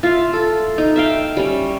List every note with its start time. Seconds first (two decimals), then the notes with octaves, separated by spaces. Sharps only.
0.03 F4 E5 F5
0.33 A4
0.78 D#4
0.96 E5 F5 G5
1.37 G3 C#4